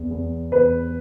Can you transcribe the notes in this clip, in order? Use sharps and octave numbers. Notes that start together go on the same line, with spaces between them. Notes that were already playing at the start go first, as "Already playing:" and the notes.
Already playing: E2
E2
E2 B4